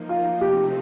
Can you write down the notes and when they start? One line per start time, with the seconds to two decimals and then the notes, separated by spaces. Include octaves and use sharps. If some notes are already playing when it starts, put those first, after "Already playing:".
Already playing: F3 A#3 D#4
0.09 F4
0.41 C3 F3 A3 C4 D#4 G4